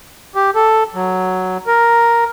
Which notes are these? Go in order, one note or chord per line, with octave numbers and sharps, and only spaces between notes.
G4
A4
F#3
A#4